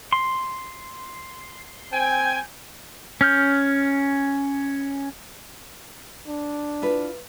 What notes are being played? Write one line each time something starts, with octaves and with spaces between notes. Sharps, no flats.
C6
C4 G5 G#5
C#4 F6 G6
D4
E4 F4 B4